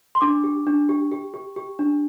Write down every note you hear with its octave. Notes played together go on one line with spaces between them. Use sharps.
C6
D4 D6
G4
D4
G4
G4
G4
G4
D4